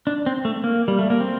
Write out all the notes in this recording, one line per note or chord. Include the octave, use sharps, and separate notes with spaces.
D4
C4
A3
A#3
G3
A3
A#3
C4